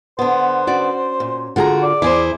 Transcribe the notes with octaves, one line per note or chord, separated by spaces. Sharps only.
D3 B3 C5
C#4 F#4 D5
A#2
D3 F4 F#4 G#4 A#5
D5
E2 E4 G#4 C5